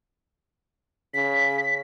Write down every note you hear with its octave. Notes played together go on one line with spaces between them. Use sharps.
C#3 B6